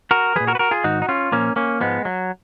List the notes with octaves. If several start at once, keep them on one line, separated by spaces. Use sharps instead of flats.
F#4 A#4
A#2 F3 G#4 B4
F#4 A#4
B4
F#4 A#4
F4 G#4
G#2 D#3 D#4 F#4
D#4
C#4 F4
A#2 F3 A#3 C#4
A#3 C#4
G#2 F3 G#3 B3
F#3